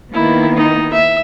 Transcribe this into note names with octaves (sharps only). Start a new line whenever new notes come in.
D#3 A#3 B3 E4
D#4
E5